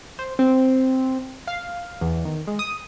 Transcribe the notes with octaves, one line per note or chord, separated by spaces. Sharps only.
C5
C4
F5
E2
D#3
G#3
D#6